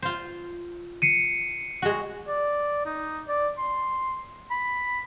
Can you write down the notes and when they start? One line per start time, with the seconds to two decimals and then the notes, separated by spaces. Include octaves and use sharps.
0.02 F4 C5
1.02 C7 C#7 D#7
1.82 G#3 F#4
2.28 D5
2.86 D#4
3.29 D5
3.58 C6
4.51 B5